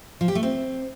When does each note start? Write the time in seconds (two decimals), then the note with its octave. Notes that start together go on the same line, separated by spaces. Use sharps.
0.21 F3
0.28 G4
0.35 A3
0.43 C4